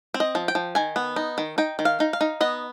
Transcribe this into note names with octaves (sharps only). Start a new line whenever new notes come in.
C4
D#5
F3
G5
F3
D#3 G#5
B3
D#4
D#3
D#4 G5
D#3
F5
D#4
F5
D#4
B3 D#5